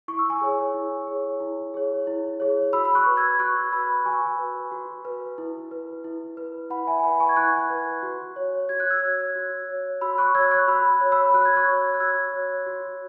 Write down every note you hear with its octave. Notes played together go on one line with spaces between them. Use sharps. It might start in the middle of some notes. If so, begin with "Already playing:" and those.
E4 C#6
E6
G#5 C#6
G#4 C#5
E4
G#4 C#5
E4
G#4 C#5
E4
G#4 C#5
F#4 B5 E6
E6
C#6 F#6
B4
E6 G#6
F#4 C#6 F#6
B4 B5 E6
F#4 G#5 C#6
B4
F#4
B4
E4
B4
E4
B4
E4 F#5 B5
E5 G#5
G#5
B4 F#5 B5
G#5 C#6
G#6
E4 C#6 F#6
B4
F#4
C#5
F#4 G#6
F#6
E6 G#6
C#5
F#4
C#5
F#4 B5 E6
C#6 F#6
C#5 E6 G#6
C#6 F#6
F#4 B5 E6
C#5
B5 E6
F#4 F#6
G#6
C#6 F#6
C#5
F#6
F#4 E6 G#6
C#5
F#4